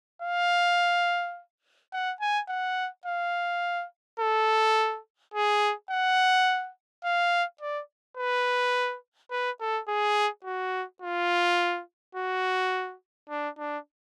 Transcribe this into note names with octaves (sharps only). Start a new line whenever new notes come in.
F5
F#5
G#5
F#5
F5
A4
G#4
F#5
F5
D5
B4
B4
A4
G#4
F#4
F4
F#4
D4
D4